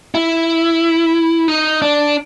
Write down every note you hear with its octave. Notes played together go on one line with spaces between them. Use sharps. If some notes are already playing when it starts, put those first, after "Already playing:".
E4
D#4
D4